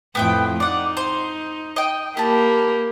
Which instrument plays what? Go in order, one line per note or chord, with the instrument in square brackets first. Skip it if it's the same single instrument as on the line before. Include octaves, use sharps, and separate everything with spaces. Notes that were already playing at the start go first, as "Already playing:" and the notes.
[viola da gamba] F2 A2 [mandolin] B3 G4 G5
[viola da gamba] D#4 [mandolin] D5 F#5
[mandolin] C5
D#5 G5
[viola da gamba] A#3 G4 A#4 [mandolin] E4 A5